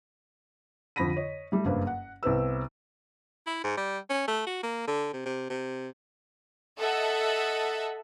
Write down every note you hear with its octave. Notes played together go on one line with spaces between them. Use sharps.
F2 D3 B5 A#6 B6 D#7
C#5 D#5
G3 A3
F#1 G2 A#3 B4 C5
F#5
C2 B3 C4 B4 E6
E4
G#2
G3
C#4
A3
F#4
A#3
D3
C3
C3
C3
A4 D#5 E5 F#5